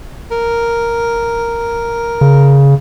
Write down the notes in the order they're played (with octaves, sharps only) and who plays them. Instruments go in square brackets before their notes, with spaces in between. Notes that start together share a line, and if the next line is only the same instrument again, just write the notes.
[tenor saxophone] A#4
[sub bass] C#3